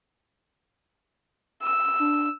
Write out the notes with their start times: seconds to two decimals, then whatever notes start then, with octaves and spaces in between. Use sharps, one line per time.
1.63 E6
2.00 D4